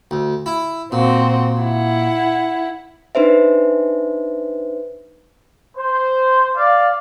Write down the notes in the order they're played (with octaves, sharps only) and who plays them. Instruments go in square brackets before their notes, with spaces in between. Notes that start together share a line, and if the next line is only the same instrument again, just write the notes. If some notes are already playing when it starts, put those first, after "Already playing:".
[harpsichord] D2
E4
[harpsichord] A#2 [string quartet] C4 F#4
[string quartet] E4 F#5
[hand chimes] D4 D#4 B4 C5 E5
[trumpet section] C5
D5 F5